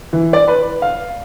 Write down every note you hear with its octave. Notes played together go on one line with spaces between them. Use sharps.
E3
D5
B4
F5